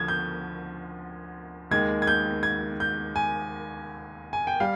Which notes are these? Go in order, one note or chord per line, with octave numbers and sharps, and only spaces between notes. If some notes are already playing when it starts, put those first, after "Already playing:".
Already playing: D2 D3 F3 G#6
G6
D#2 D#3 G#3 G#6
G#6
G6
G#6
G6
G#5
G#5
G5
G3 F5